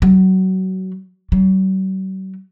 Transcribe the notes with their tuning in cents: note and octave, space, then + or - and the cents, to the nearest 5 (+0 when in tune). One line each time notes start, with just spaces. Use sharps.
F#3 +25
F#3 +45